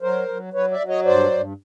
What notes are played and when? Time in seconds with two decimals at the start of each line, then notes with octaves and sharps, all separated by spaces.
0.02 F#3 A#4 C5
0.28 F#3
0.53 F#3 B4 C#5
0.71 D5 E5
0.80 F#3
0.88 C#5 D#5
1.05 G2 C5 D5
1.31 G2